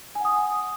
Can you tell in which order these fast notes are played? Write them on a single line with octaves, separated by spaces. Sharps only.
G#5 F#5 D#6